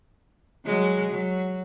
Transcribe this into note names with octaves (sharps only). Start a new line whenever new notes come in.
F#3 G#3
F#3